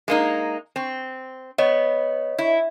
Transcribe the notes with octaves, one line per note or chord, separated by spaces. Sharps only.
G#3 A#3 D#4
C4
B3 C#5 D#5
E4